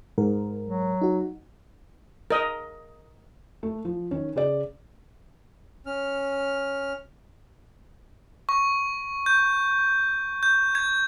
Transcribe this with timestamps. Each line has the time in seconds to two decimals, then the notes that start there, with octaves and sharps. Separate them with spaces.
0.18 G#2 A#4
0.67 F#3
1.01 D#4 F#4
2.31 A#4 D#5
3.63 A3
3.85 F3
4.11 D#3 C#4
4.36 C#3 G#4 D5
5.86 C#4 F6
8.49 C#6
9.26 G6
10.43 G6
10.75 G#6